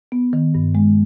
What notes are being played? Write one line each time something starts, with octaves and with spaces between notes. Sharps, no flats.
B3
D#3
G2
G#3